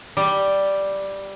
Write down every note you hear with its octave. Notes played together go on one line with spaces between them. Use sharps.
G3